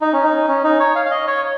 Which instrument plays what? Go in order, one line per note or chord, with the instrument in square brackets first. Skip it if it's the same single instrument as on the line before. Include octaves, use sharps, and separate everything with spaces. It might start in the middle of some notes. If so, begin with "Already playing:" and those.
[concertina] D#4
C#4
D#4
C#4
D#4
C#5
F5
F5
D#5
C#5